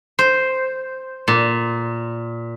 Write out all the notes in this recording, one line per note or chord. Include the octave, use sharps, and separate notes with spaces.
C5
A#2